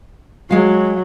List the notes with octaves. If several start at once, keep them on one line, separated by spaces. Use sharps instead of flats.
F#3 G#3 F5